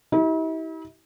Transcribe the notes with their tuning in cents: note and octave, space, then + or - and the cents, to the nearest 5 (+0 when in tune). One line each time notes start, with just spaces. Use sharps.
E4 -45 G4 -35